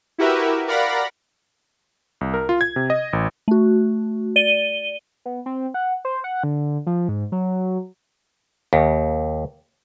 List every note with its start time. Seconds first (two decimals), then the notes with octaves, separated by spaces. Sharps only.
0.18 E4 F#4 G4 A#4 B4 E5
0.68 A#4 D5 F5 F#5 B5 A#6
2.21 C2
2.34 A#4
2.49 F4
2.61 G#6
2.76 C3
2.90 D#5
3.13 A1
3.48 A3 F#4
4.36 D5 D#7 G7
5.25 B3
5.46 C4
5.74 F#5
6.05 C5
6.24 F#5
6.44 D3
6.87 F3
7.09 G#2
7.32 F#3
8.73 D#2